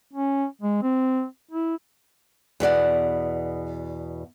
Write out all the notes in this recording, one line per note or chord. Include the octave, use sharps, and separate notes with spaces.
C#4
G#3
C4
E4
E2 B2 D5 F#5